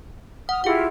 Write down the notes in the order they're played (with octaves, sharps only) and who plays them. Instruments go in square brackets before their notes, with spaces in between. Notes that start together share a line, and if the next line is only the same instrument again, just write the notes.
[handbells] F#5 [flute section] D#6 F6
[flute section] E4 F4 G4 [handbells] G#4 F#5